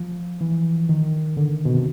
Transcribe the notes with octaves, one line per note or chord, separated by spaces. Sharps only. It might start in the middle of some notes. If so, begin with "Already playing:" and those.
Already playing: F3
E3
D#3
D3
B2
C3